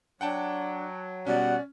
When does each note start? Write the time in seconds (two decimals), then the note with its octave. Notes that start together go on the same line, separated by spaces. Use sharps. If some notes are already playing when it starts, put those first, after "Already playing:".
0.21 F#3 D4 F#5 G5 A5
1.27 B2 G3 C#4 D5 F#5